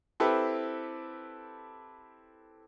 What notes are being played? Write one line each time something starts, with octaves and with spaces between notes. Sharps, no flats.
C4 E4 G4 A4 B4